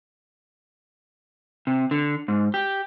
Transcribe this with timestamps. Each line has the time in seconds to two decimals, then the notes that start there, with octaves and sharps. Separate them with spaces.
1.67 C3
1.91 D3
2.28 G#2
2.54 G4